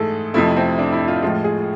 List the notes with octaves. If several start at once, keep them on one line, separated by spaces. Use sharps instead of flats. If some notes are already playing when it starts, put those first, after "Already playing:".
Already playing: G#2 E3 A3 G#4 A4
F2 C3 F3 A3 E4
C4
D4
E4
F4
A2 F3 G#3 F4
G#4